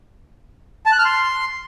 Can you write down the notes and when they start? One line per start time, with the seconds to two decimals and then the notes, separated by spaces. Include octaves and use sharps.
0.86 A5
0.92 F#6
0.98 F6
1.05 C6